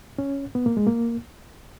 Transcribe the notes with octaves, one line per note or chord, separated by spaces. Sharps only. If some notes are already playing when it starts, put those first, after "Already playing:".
C#4
B3
A#3
G#3
A#3